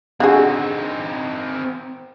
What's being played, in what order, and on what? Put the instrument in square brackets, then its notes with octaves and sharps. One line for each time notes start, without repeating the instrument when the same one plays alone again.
[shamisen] D3 F#4 G#4 [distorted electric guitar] C4 D#4